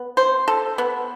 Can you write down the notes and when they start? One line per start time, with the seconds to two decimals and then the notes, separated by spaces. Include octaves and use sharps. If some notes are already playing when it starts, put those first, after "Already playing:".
Already playing: B3
0.17 C5
0.48 A4
0.78 B3